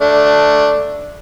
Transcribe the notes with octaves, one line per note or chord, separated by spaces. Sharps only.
A3 D4